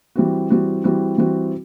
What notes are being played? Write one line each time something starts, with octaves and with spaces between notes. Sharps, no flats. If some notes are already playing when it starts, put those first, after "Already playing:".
E3 G3 C4 F#4
E3 G3 C4 F#4
E3 G3 C4 F#4
E3 G3 C4 F#4